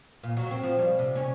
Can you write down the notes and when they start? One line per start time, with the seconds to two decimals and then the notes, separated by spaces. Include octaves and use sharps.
0.23 A#2
0.37 F#3
0.51 C4
0.63 F3
0.79 G3
0.99 C3
1.15 C#4